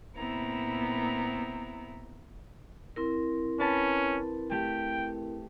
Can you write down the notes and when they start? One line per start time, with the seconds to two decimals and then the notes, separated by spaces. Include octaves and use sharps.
0.17 A#2 B3 C4 E4 A#5
2.96 C4 E4 A#4
3.60 C#4 B4 A5
4.51 A3 G4 G5